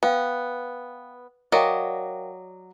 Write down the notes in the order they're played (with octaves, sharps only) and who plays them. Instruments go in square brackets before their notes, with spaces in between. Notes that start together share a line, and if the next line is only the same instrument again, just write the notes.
[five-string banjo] B3 [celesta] B4 F5 G5
[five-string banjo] F#3 D5 D#5 [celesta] A#4 F5 G5